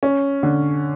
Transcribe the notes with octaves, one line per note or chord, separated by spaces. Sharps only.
C#4
D3